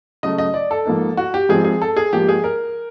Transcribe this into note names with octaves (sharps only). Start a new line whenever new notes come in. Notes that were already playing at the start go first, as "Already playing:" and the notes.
C#3 F#3 A3 D#5
D#5
D5
A4
G#2 F3 A#3 D#4
F#4
G4
G#2 F3 G#3 C4 F4 G#4
G#4
A4
G#4
G#2 F3 A#3 G4
G#4
A#4